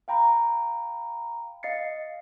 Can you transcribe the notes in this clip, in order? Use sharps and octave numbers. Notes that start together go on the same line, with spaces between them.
F5 G5 A#5 B5
D#5 F5 A6 C7 C#7